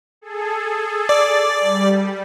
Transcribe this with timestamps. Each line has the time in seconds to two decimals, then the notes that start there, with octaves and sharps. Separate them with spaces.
0.21 G#4 A4
1.09 D5
1.60 G3